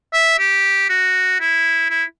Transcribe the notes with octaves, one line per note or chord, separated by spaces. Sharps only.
E5
G4
F#4
E4
E4